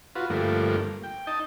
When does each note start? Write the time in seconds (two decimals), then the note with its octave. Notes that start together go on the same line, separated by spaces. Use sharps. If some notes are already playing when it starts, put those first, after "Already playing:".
0.16 F4 F#4 B4
0.30 G2 D3 F3 A3 A#3
1.04 G5
1.27 D#4 D#5 A5